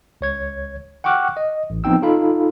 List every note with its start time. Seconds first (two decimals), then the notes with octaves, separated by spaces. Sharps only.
0.21 C#2 C#5 G#6
1.04 F#5 G5 C#6 D6 F6 F#6
1.37 D#5
1.70 A1
1.84 F3 B3 C4 D#4 G5 E6
2.02 D#4 F4 A4 F5 B5